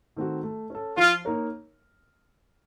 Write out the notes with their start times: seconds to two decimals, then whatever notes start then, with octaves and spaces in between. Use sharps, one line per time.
0.17 D#3 A3 C4 F#4
0.43 A3
0.70 C#4 A4
0.97 F3 F4
1.25 A#3 D#4 A#4 C#5